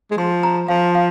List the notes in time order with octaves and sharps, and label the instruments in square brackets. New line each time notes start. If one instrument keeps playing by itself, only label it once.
[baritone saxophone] G#3
[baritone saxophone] F3 [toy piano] C6
[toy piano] A#5
[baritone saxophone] F3 [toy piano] F5
[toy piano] F5